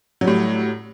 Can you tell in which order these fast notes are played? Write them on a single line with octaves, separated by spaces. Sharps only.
F#3 G3 A2